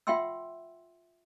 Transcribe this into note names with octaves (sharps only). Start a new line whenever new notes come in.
F4 E5 F#5 G5 C6 E6